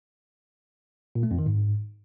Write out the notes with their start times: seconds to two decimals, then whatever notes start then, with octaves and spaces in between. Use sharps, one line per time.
1.15 A#2
1.23 A3
1.31 F2
1.39 D#3
1.46 G#2